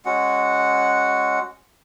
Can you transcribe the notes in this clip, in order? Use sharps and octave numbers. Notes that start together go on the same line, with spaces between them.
G#3 C#4 F#4 F#5